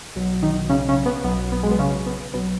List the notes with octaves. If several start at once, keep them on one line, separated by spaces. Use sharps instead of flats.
B1 B2 F#3
D#3 D#4
C#3 C#4
C#3 C#4
B3
B1 B2 F#3 B3
B3
G#3
B3
C#3 C#4
B3
B1 B2 F#3 B3